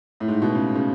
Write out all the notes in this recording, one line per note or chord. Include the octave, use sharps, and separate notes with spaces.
A2
G#2
B2
C#3
C#3